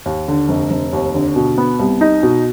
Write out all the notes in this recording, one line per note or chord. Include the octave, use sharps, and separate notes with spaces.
D#2
D3
F1
F1
D#2
D3
B2
B3
C2
D#4
B2